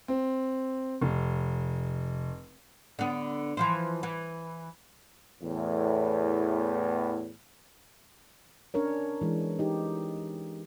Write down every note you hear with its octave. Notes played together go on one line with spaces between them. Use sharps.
C4
F1
D3 B3
E3 F3 C5
E3
E2 A2
C#4 D4 A#4 C#5
E3 G#3
D#4 G4